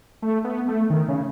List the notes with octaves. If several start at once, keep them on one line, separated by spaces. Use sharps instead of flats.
A3
B3
A3
D#3
C#3